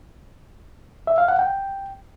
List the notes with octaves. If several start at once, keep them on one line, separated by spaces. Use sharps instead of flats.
E5
F5
F#5
G5